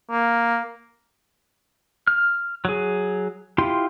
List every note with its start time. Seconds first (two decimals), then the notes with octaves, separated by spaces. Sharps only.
0.10 A#3
2.07 F6
2.65 F#3 G#4
3.58 E4 F4 G4 C6